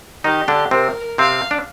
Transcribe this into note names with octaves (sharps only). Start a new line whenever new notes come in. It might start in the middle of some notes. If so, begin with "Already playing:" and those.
D#3 D#4 G4
D3 D4
C3 C4 A#4
C3 C4 F5
D4